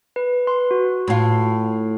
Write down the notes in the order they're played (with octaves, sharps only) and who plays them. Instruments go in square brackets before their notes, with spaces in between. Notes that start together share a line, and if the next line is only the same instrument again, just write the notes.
[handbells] B4
B4 C6
F#4
[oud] A2 F4